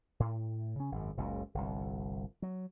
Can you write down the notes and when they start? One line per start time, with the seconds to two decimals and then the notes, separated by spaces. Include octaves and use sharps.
0.20 A2
0.75 C#3 C#4
0.92 G#1 F#2
1.17 F#1 C#2 A#2 C#3
1.54 G1 C2
2.42 F#3